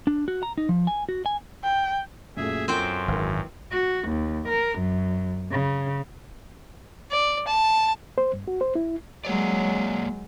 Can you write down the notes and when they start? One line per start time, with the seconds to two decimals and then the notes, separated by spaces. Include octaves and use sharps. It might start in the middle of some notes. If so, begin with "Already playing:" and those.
0.07 D4
0.28 F#4
0.43 A#5
0.58 D#4
0.69 F3
0.87 G#5
1.09 F#4
1.26 G#5
1.64 G5
2.37 F#2 A#2 A3 G#4 E5
2.68 F#2 C4 F4 A4 A#4 C5 G5
3.08 G#1 E3 A#4
3.73 F#4
4.09 D#2
4.49 A#4
4.79 F#2
5.51 C#3
7.11 D5
7.47 A5
8.18 C5
8.33 G2
8.48 F#4
8.61 C5
8.75 E4
9.25 F#3 G#3 A#3 C#5 D5